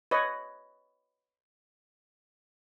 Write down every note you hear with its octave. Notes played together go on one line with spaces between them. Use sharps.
B4 C#5 D#5